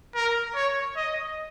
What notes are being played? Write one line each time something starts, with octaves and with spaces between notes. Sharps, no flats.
A#4
C#5
D#5